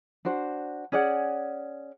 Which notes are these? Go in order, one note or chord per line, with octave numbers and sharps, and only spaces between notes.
D4 F#4 C5
C#4 G#4 D5 F#5